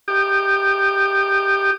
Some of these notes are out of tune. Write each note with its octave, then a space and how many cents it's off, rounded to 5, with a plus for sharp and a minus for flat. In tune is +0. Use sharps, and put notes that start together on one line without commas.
G4 +0 D#6 -35